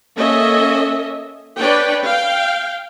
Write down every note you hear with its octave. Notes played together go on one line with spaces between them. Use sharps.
A#3 C#4 A4 D#5 E5
D4 B4 C#5 D5 G5
F5 G5